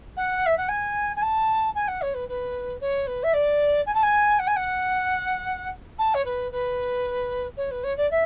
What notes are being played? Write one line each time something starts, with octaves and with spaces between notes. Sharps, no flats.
F#5
E5
F#5
G#5
G#5
A5
G#5
F#5
C#5
B4
B4
C#5
B4
E5
D5
G#5
A5
G#5
F#5
G#5
F#5
A5
C#5
B4
B4
C#5
B4
C#5
D5
E5